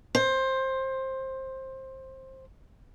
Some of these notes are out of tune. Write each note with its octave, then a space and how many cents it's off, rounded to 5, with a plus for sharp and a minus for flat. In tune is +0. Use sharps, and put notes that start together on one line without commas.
C5 +15